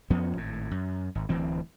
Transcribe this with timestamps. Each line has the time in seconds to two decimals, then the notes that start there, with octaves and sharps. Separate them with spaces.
0.10 F2 F3 B3 C#4
0.37 G#1 A2
0.71 F#2
1.15 G#1
1.29 D1 D2 E3 C4